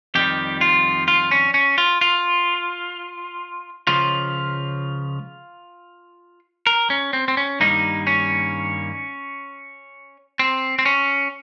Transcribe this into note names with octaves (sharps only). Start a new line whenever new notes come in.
F2 D#3 G3 G4
F4
F4
C#4
C#4
F4
F4
C#2 C#3 F3 F4
A#4
C#4
C4
C4
C#4
G2 D#3 G3 A#3 D#4
C#4
C4
C4
C#4